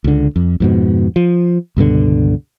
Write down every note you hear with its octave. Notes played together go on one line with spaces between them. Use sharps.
C#2 D3
F2
F2 G#2 B2
F3
C#2 G2 B2 D3